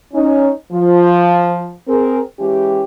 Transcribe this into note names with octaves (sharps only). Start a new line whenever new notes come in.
C#4 D#4
F3
C4 G#4 A#4
E3 G#3 C#4 G4